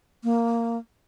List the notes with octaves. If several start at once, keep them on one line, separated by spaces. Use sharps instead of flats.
A#3